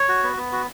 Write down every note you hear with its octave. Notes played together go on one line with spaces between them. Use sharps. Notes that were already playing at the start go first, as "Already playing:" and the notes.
Already playing: C#5
F#4
B3
B3
F#4